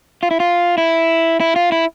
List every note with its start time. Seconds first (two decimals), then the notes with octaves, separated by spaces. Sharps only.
0.23 F4
0.31 E4
0.40 F4
0.78 E4
1.40 E4
1.56 F4
1.72 E4